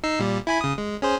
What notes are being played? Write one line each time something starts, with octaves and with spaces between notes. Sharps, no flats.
D#4 E6 C7
A#2 G3
E4 G#5 B5
C#3 D#6
G#3
C#4 G#4 C5